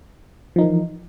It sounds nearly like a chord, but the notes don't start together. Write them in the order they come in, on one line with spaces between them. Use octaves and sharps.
F3 D#4 A#4 E3